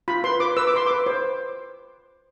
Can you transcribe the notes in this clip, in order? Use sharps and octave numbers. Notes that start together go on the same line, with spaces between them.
F4 B5
B4 C6
B4 D6
B4 E6
D6
B4 C6
B4 D6
C5